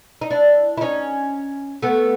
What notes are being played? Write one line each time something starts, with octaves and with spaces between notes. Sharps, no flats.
D#4
D4 E4
E4
C#4 D#4
A3 B3